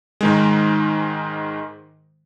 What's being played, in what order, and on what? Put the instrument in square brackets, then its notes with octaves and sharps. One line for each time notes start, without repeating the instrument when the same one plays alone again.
[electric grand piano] G#2 D#3 G#3